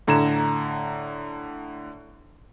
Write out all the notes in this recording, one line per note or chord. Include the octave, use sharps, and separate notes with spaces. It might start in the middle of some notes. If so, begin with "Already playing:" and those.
A2 D3 A#5 G#6 E7